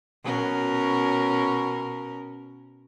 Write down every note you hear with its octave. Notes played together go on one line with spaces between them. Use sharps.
B2 C#4 A#4